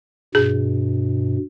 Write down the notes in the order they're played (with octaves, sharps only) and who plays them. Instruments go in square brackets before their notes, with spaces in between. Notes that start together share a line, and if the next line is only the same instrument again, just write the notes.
[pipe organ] G2 B2 [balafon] G#4